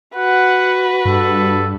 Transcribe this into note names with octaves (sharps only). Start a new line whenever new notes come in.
F#4 B4 F#5
G2 A4